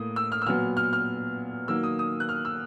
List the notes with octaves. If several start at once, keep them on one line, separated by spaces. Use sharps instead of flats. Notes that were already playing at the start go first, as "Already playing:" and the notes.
Already playing: A2 A#3 D#6
E6
F6
E6
A#2 F#3 B3 F6
F6
F6
D#3 F#3 A#3 E6
D#6
D#6
F#6
F6
E6